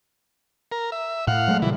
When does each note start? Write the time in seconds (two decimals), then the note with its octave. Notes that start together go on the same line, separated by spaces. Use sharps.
0.72 A#4
0.92 E5
1.27 A2 F5 F#5
1.48 F#3 G#3 A3
1.62 A#2 C#3 E3 G3